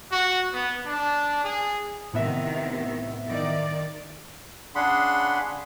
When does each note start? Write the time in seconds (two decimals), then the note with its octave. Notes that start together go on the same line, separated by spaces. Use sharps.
0.11 F#4
0.53 B3
0.86 D4
1.44 G#4
2.13 A2 C3 D#3 B3 E5
3.28 D#3 D5
4.75 C#3 D4 G#4 F#5 B5 C6